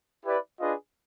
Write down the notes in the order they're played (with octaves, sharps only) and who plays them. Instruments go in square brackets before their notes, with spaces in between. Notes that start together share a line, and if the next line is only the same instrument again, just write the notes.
[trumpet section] E4 G4 B4 D5
D4 F4 G#4 B4 D#5